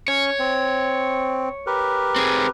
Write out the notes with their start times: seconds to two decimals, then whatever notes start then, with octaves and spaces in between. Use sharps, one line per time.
0.08 C#4 C#5
0.39 C4
1.67 G4 A#4 B4
2.16 C4 G#4